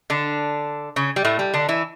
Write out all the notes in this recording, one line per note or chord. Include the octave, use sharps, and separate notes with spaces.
D3 D4
C#3 C#4
G3
A2 A3
G3
D3 D4
E3 E4